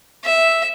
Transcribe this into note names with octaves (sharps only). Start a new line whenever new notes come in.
E5